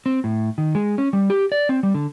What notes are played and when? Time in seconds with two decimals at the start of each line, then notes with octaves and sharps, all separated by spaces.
0.06 C4
0.24 A2
0.58 D#3
0.75 G#3
0.98 C#4
1.13 G3
1.30 G4
1.52 D5
1.69 C4
1.83 G3
1.94 D3